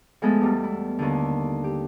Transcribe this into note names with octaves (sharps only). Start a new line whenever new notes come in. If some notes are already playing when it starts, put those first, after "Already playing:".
F3 G#3 A3 B3 G#4 A4
E2 G3
E4
D#2 D3
G4